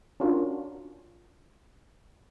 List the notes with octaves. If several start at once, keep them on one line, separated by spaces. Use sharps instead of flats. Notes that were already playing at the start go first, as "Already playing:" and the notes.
C#4 D4 F4 F#4 A#4